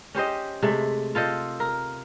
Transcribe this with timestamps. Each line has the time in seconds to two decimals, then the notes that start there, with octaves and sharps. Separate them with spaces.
0.15 C#4 G4 C5 D#5
0.62 C3 G#3 A3
1.15 F4 A4 C5 D#5
1.60 A#4